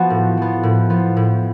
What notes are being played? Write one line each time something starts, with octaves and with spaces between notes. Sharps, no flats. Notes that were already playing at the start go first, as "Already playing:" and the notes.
Already playing: F3 B3 F#4
A2
F3 B3
A2
F3 B3
A2